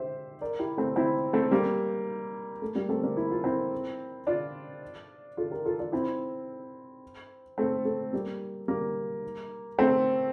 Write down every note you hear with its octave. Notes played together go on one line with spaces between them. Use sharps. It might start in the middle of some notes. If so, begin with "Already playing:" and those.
Already playing: G4 C5 E5
A#4 D5
E4 G4
A3 C4
C4 E4
A3 C4
G3 A#3
A3
G3 A#3
A3 C4
A#3 D4
E4
F4
C4 E4
D4 F4
F4 A4
G4 A#4
F4 A4
D4 F4
C4 E4
A3 C4
A3
G3 A#3
G3 A#3
A3 C4